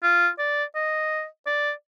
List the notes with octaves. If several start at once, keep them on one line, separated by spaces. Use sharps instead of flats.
F4
D5
D#5
D5